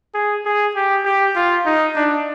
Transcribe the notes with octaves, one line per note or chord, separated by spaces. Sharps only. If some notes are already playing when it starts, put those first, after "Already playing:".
G#4
G#4
G4
G4
F4
D#4
D4